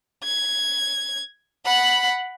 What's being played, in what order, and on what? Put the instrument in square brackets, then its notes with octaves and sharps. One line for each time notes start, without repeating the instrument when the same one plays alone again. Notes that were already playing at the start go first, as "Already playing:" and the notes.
[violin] G#6
F#5 B5